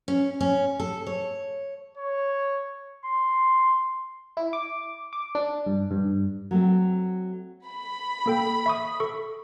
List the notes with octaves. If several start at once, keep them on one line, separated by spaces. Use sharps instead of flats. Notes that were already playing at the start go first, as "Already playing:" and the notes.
C#4
C#4
A4
C#5
C#5
C6
E4
D6
D6
D4
G2
G2
F#3 A3 C4
B5
A#3 A4 G5
E5 C#6 D#6
A4 C#6